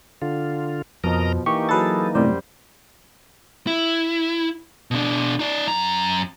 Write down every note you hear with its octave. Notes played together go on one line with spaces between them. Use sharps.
D3 F4
F2 B2 F3 A#4 D#5 A#5
E3 A#3 D#4 G4 C#6
F#3 G#4 A4 B4 A6
F#2 A2 C3 G3 C5 D5
E4
B2 D4
D#4 D5
F#2 A#5